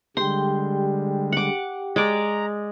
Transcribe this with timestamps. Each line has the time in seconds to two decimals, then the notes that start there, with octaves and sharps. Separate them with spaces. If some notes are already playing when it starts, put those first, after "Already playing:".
0.17 D3 G3 G#3 G4 G5 C6
1.32 F#5 D6
1.96 G#3 D5 A#5 D6